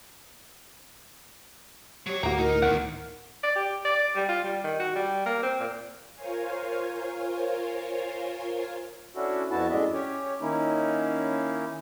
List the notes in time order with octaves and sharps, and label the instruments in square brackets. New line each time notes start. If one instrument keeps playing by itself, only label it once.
[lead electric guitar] F#3 C#5 [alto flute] G4
[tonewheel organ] D2 A2 [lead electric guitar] A#3 [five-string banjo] F#4 A#5 [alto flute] G4
[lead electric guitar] D#4 [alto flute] A#4
[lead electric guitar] D#3 B3 [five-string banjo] F#5
[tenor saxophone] D5
G4
D5
G3
F4
G3
D#3
F#4
G3
A#3
C4
A#2
[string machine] F4 A#4 C5 C#5 F5 G#5
[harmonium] C#4 D4 E4 F#4 A4
F2 B3 E4 F#4 A5
F#2 A2 G#3 D4 D#5 E5
C#4 G4 C#5
D#3 A#3 C#4 D#4 E4